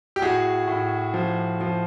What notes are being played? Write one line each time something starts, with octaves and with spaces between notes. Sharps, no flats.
G4
A2 F#4 G#4
A2
F3
F3